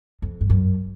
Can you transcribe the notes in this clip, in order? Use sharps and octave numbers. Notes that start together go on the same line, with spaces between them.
F2
G2
F#2